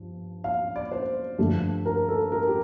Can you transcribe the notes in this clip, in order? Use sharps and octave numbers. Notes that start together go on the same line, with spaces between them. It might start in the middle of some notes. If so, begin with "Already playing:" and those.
Already playing: G2 F3
F5
D5
C5
G2 D3 F3 A3
A#4
A4
A#4
G4